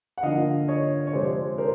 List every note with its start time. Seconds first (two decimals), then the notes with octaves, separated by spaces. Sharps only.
0.18 F#5
0.23 D3 F3 A#3 D#5 F5
0.68 C#5 D#5
1.07 C#5
1.13 C3 F3 G#3 C5 D5
1.58 A#4 C5